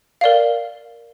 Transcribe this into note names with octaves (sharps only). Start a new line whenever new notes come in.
A#4 D5 F5